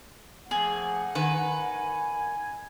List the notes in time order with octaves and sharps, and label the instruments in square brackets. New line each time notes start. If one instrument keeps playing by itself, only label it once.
[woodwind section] F3 A3 A#3 [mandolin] G#4 [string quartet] F#5
[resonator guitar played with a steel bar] D#3 [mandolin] B4 [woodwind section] G#5